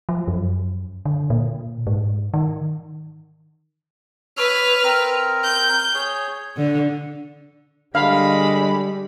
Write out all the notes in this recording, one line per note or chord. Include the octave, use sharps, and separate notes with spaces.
F3
F#2
D3
A#2
G#2
D#3
B4 C#5 E6 F6
C4 A#4 A#5
G6
G#4 C#5
D3
D3 G3 G#3 F5 B5